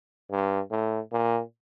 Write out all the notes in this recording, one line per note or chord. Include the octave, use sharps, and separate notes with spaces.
G2
A2
A#2